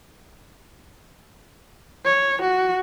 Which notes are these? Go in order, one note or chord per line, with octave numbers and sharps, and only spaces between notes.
C#5
F#4